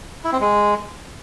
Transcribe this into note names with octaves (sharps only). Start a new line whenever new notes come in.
E4
C4
G#3